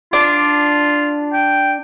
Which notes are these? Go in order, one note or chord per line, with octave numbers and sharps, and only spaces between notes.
D4 F4
G5